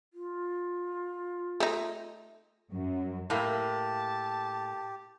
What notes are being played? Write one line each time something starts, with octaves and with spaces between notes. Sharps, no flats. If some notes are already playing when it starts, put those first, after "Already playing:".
F4
A3 D#4
F#2
A2 A#3 G4 A5